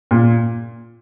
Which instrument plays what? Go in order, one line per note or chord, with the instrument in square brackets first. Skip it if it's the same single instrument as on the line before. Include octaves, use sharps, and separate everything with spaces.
[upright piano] A#2